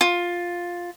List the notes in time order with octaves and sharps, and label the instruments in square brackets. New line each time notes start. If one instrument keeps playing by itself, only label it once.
[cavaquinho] F4